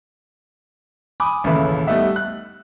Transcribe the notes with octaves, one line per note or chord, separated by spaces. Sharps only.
G#5 B5 D6 D#6
A1 D#2 C#3 A4 B4 E5
G3 A3 B3 D#4 E5 F#5
F#6